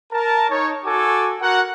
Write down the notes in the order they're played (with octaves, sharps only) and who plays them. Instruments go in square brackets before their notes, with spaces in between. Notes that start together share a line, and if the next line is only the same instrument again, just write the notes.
[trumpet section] A#4 A5
D#4 C#5
F#4 A4 G#5 D6
F#4 A#4 F#5